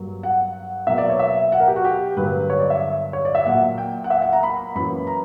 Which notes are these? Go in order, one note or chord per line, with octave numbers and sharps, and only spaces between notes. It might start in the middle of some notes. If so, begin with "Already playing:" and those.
Already playing: G2 F#3 A#3
F#5
B2 F#3 A#3 E5
D5
C#5
E5
F#5
A#4
G4
F#4
G4
G2 D3 F#3 A#3 B4
C#5
D5
E5
C#5
D5
E5
A#2 F#3 A#3 F#5
G5
F#5
E5
F#5
A#5
B5
F#2 E3 A#3 B5
A#5